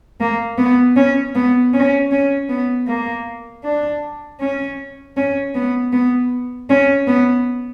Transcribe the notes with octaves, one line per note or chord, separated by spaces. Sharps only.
A#3
B3
C#4
B3
C#4
C#4
B3
A#3
D4
C#4
C#4
B3
B3
C#4
B3